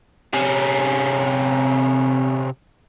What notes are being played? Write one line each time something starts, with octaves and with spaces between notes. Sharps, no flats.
C3 C#4